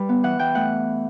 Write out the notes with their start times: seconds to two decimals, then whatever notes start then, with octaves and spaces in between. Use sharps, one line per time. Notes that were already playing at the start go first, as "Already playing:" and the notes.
Already playing: G3 B4
0.09 B3
0.23 E3 F#5
0.39 E3 G5
0.55 A3 F#5